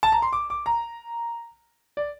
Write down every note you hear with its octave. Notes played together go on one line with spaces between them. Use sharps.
A5
A#5
C6
D6
D6
A#5
D5